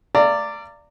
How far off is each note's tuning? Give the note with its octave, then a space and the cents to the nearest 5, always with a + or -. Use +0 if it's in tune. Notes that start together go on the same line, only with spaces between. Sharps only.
D5 +0 F5 -40 A#5 -30